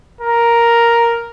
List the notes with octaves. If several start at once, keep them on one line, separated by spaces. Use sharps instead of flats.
A#4